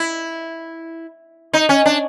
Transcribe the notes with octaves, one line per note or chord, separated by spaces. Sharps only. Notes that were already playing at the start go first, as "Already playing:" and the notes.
Already playing: E4
D#4
C#4
D4